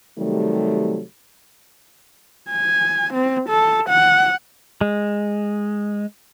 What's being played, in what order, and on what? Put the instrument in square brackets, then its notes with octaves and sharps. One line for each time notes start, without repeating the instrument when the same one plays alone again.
[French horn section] C3 D#3 F#3 G3 A3
[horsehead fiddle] G#5
C4
A4
F#5
[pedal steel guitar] G#3